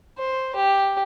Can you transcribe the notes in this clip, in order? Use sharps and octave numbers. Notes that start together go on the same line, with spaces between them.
C5
G4